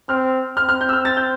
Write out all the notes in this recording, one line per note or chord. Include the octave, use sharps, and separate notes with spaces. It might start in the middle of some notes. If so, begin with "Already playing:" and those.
C4 F6
C4 F6
F6
G6
E6
F6
A6
G6